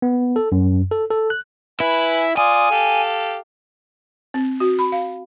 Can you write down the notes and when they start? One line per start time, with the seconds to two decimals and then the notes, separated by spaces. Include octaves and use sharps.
0.02 B3
0.36 A4
0.52 F#2
0.91 A4
1.10 A4
1.30 F#6
1.80 E4 B4 G#5
2.37 F4 D5 G#5 D#6
2.71 G4 A4 F5
4.34 C4
4.60 F#4
4.79 B5
4.92 F5